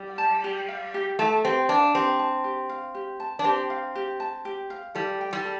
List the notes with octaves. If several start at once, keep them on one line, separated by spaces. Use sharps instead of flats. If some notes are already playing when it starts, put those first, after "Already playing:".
Already playing: G3
A5
G4
F5
G4
A3 A5
C4 G4
D4 F5
C4 G4
A5
G4
F5
G4
A5
D4
C4 G4
F5
G4
A5
G4
F5
G3 A4
G5
G3
A4